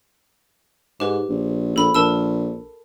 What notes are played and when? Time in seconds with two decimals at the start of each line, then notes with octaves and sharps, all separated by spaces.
1.00 G#2 G4 B4
1.29 A#1
1.76 A#1 A4 B5
1.95 A#1 A#4 A5 E6